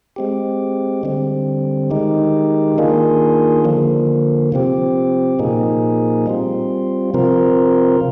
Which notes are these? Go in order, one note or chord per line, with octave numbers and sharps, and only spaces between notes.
G#3 C4 G4
D3 G3 C4
D#3 G#3 D#4 G4
D#3 A#3 D4 F4 G#4
D3 F3 A#3
C3 F3 C4 G4
A#2 F3 A#3 D#4 G#4
G3 C4 F4
C3 F3 C4 F4 A#4